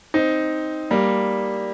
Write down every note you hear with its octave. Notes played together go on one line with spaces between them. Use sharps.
C4 D#4
G3 A#3